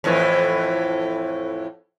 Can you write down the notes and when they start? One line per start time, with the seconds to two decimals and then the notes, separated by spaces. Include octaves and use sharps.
0.04 F2 A2 E3